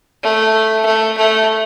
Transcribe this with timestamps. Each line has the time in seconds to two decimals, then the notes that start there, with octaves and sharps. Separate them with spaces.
0.23 A3
0.85 A3
1.17 A3